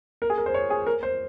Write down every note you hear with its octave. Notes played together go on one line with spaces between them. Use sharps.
A#4
G#4
A#4
C5
C#5
G#4
A#4
C5